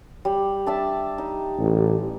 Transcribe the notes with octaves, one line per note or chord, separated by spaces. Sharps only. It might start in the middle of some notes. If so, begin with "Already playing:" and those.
G3
D4 E5 A5
D#4
A1